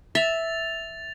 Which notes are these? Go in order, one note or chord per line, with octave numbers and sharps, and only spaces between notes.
E5 A6 F7